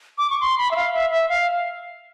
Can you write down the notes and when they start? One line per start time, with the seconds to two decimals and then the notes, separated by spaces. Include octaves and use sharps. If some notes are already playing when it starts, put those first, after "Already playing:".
0.18 D6
0.30 C#6
0.40 C6
0.58 B5
0.71 E5
0.76 F5
0.94 E5
1.10 E5
1.29 F5